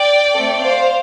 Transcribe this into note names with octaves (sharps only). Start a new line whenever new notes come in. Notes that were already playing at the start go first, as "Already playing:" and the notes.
Already playing: D5 G5
A3 C4 A4
C5 F5